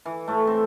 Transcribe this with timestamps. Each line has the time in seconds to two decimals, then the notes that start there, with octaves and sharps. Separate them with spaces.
0.06 E3
0.28 A2 A3
0.47 C4